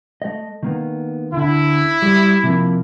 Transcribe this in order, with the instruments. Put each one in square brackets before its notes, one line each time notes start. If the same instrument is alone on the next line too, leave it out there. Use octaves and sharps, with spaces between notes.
[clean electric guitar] A3 D#5
D#3 A#3 B3
[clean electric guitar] D2 D3 [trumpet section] E4
[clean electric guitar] G3
C3 F3 A#3